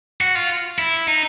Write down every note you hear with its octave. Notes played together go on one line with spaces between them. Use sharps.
F#4
F4
E4
D#4